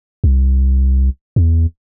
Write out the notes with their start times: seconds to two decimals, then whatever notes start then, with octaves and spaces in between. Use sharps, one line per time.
0.24 C2
1.36 E2